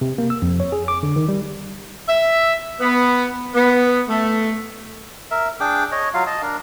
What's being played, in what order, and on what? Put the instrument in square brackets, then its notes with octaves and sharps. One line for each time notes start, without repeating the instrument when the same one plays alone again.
[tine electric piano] C3
A#3
E6
F2
C#5
G#4
D6
D3
D#3
G3
[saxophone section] E5
B3
B3
A3
[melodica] A#4 E5
D4 G#4 G5 D6
C#5 D#5
F#3 F4 F5
D#5 A5
D4 A#4